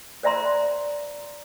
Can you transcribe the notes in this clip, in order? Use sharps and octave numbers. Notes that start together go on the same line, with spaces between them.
C5 D5 E5 A#5 C6